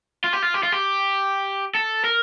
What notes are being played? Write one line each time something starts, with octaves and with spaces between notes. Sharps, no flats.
F4
G4
F4
G4
F4
G4
A4
A#4